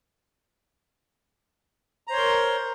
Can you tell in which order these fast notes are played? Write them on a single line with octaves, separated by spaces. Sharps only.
A#5 C5 C#5 C6 A#4